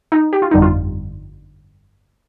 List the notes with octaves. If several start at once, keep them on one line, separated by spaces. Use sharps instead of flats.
D#4
G4
F4
G1 F2 D3 G3 D#4
F4